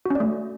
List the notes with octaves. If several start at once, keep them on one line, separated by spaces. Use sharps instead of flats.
A3 C#4 F#4 D5